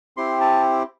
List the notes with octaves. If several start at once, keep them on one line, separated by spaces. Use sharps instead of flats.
C4 E4 G4 C6
A5